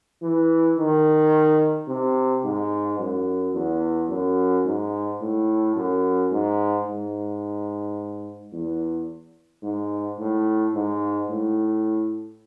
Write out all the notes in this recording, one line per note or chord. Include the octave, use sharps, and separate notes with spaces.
E3
D#3
C3
G#2
F#2
E2
F#2
G#2
A2
F#2
G#2
G#2
E2
G#2
A2
G#2
A2